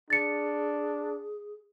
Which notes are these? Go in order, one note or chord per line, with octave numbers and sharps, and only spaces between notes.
D4 G#4 A6 C#7